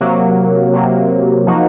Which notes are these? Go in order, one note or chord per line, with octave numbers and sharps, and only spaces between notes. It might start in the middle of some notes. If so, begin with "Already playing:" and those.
C3 F#3 A#3
C3 F#3 A#3
F3 A#3 D#4 F#4